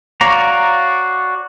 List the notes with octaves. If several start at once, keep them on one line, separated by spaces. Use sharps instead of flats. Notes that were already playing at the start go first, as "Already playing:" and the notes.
F#4 C#5 D5 F5 A#5